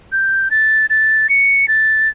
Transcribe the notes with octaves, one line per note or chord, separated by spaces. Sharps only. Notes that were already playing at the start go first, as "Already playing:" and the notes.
G6
A6
A6
C#7
A6